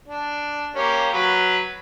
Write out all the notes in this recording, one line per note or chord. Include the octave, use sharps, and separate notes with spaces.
D4
A#3 C#4 G4
F#3 B4